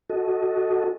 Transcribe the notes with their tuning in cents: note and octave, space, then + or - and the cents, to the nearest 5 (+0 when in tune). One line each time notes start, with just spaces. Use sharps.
F#4 +0 A4 -10 D#5 +0